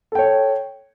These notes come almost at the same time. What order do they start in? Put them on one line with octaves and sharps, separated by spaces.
A4 G5 C#5